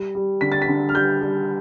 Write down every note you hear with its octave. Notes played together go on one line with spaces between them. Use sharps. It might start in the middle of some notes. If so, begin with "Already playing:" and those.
Already playing: G3
G3
D3 B6
A6
B6
D3
F6
G3 G6
G3